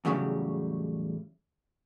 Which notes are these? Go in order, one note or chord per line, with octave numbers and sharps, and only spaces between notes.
E2 A2 C#3 F#3 G3